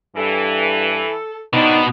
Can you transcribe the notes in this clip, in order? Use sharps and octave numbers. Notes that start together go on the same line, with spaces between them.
G2 E3 A4
B2 B3 C4 D4 D#4